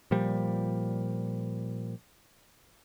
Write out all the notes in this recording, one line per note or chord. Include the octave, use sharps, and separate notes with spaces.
A#2 F3 G3